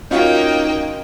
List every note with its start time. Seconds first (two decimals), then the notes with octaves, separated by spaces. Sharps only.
0.11 A#3 C#4 D#4 F4 F#4 G5